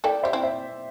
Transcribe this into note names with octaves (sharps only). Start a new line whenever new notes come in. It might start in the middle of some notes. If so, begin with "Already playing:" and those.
E4 A4 D5 G5
G4 C5 E5
C4 E4
C5 E5